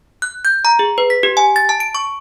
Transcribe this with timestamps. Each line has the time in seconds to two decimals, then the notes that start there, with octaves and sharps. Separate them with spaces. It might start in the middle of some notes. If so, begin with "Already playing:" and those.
0.22 F#6
0.45 G6
0.65 A#5
0.79 G#4
0.98 B4
1.10 B6
1.23 G4
1.37 G#5
1.56 A6
1.69 A5
1.80 D7
1.95 C#6